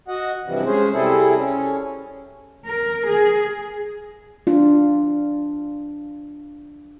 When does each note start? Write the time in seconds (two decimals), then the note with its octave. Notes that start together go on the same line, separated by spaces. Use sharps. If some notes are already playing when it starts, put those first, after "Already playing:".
0.08 F#4 D#5 F#5
0.45 G2 C3 E3 F3 G3
0.66 G#3 C#4 G#4 C5
0.93 C3 G3 C4 E4 G#4 A4
1.37 C#4
2.65 A#4
3.07 G#4
4.47 D4 F4